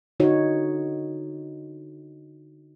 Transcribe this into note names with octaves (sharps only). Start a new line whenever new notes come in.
D3 D#4 F#4 C#5